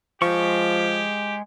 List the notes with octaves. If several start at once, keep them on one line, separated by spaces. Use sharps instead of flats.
F3 G#3 G4 C#6